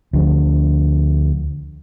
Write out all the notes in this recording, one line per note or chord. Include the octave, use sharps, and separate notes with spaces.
D2 F3 D4